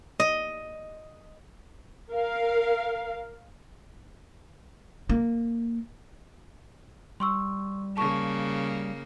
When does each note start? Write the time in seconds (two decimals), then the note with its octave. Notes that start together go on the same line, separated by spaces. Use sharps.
0.20 D#5
2.11 A#4 F5
5.10 A#3
7.20 G3 C6 C#6 E6
7.97 C#3 A#3 A5 C#6